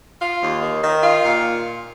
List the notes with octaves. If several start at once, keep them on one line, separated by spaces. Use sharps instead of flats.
F4
D#2
D#3
D#3
F4
A#2